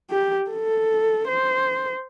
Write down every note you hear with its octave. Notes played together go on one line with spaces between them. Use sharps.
G4
A4
C5